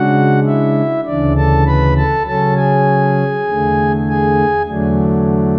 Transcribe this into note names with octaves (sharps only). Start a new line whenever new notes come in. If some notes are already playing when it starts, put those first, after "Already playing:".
Already playing: C#3 G#3 D4 F#4 F#5
E4 E5
D2 C#3 E3 D4 D5
A4 A5
B4 B5
A4 A5
C#3 F#3 C#4 A4 A5
G#4 G#5
E2 D3 A3
G#4 G#5
E2 D3 F#3 A3 D4